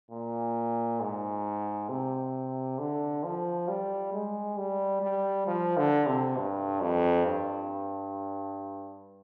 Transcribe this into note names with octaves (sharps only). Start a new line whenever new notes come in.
A#2
G#2
C3
D3
F3
G3
G#3
G3
G3
F3
D3
C3
G2
F2
G2